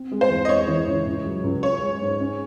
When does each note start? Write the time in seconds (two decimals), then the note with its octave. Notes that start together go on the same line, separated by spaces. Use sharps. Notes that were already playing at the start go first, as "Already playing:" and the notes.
Already playing: C4
0.12 G#3
0.21 C5
0.30 E2
0.45 D#5
0.49 G#3 C#5
0.68 E3
0.87 C#2
1.06 C#2
1.26 F#3
1.44 C#2
1.63 C#4 C#5
1.82 G#3
2.02 G#2
2.20 C#4